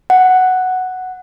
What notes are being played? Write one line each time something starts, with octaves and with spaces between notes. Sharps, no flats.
F#5